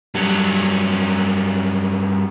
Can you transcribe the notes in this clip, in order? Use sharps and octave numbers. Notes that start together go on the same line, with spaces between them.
G2 F#3